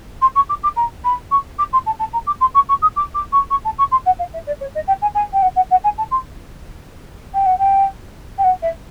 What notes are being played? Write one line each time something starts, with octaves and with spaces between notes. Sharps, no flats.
C6
C#6
D6
D6
A#5
B5
C#6
D6
C6
A5
A5
A#5
D6
C6
C#6
C#6
D#6
D6
D6
C#6
C#6
A5
C#6
C6
F#5
F5
E5
D5
C#5
D#5
G5
G#5
G#5
G5
F#5
F#5
F#5
G#5
A5
C6
G5
F#5
G5
G5
F#5
E5